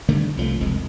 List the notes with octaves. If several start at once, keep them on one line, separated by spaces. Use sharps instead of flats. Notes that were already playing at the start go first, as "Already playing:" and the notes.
D3 D#3 G3 A3
C2 F3 F#3 A3
E1 C2 F2 G#3